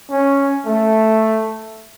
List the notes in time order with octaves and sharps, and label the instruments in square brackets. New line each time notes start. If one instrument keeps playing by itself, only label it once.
[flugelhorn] C#4
A3